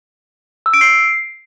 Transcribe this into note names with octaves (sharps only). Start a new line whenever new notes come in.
E6
D7
C7